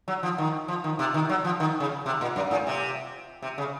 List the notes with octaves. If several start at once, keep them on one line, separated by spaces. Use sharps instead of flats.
F#3
F3
D#3
F3
D#3
C3
D#3
F#3
F3
D#3
C#3
C3
A#2
F#2
A2
C3
C3
C#3